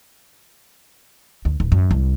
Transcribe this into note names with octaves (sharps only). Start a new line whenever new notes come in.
D2
D1
F#2
C2